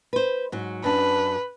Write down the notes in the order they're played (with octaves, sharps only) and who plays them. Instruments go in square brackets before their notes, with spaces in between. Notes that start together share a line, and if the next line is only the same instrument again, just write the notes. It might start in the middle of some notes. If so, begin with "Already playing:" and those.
[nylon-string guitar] B4 C5
G#2 F#3
[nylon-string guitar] F#2 D4 [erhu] B4